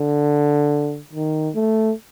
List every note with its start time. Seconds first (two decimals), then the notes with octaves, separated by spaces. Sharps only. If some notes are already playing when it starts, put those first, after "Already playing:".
Already playing: D3
1.13 D#3
1.55 A3